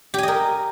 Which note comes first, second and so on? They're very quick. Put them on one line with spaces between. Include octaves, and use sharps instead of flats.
G4 G#5 D#5 A#4